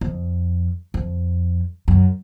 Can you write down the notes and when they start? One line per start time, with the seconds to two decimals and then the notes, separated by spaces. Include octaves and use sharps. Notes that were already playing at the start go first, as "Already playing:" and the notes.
0.01 F2
0.94 F2
1.88 F#2